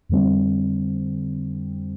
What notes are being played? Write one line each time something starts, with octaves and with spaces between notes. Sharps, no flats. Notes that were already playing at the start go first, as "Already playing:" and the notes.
F2 D3 G3 C4